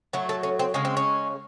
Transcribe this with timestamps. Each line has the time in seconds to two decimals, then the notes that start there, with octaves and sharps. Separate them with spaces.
0.13 A2 F#3 A3
0.29 A4
0.43 C#4
0.59 C4
0.74 C#3 G#3 C#4
0.85 C4
0.97 C#4